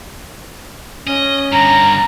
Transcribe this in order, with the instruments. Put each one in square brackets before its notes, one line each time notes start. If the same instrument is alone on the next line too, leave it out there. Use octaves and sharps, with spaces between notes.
[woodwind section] C#4 [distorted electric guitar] D#5
[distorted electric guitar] G2 D3 [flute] A#5